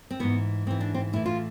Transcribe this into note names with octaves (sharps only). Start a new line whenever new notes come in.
C4
G#2 E3 B3
G#2 E3 C4
D4
C4
A2 E3 E4
F4